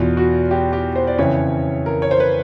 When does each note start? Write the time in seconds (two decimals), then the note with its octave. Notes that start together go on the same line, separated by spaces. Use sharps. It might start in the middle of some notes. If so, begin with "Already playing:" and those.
Already playing: E2 B2 F4
0.17 F#4
0.51 G4
0.73 G4
0.96 C5
1.07 D5
1.18 F2 C#3 E3 C#5
1.86 A#4
2.02 C#5
2.11 C5
2.20 B4